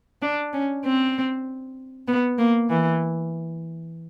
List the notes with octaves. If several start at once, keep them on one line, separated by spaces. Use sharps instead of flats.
D4
C#4
C4
B3
A#3
E3